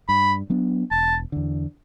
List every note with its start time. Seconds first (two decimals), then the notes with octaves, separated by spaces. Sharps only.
0.09 G2 B5
0.50 F#3 B3 D4
0.91 E1 A5
1.32 E2 D3